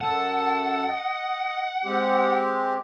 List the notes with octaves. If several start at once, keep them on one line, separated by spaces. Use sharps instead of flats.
F#2 A4 F#5 A5
D#5
G#3 C4 G4